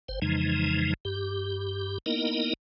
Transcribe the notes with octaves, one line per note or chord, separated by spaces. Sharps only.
G1 C5
F2 C#3 E3 F3 G#3 D#4
G2 G4
A#3 B3 D#4 E4 A#4 D#5